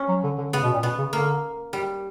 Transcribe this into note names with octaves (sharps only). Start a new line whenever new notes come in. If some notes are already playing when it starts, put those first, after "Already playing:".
Already playing: C#4
F#3
D3
D3
C#3 B3
B2
A#2
B2 B3
C#3
D3 A#3
G3